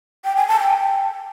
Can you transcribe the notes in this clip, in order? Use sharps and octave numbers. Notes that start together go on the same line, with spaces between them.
G5
G#5
A5
G5